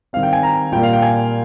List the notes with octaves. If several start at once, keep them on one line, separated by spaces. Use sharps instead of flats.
D#3 G3 C4 F5
G5
G#5
A#5
A#2 G3 A#3 G5
F5
G5
G#5